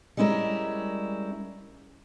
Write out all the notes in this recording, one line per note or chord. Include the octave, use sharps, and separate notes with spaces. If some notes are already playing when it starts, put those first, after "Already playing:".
G3 G#3 C#4 E4 A#4